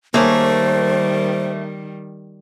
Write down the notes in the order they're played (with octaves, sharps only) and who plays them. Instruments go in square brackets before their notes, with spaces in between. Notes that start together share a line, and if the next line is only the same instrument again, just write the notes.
[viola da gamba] D#3 G3 [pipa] A3 G#4 A#4 [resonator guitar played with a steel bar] A#3 C#5 [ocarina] C5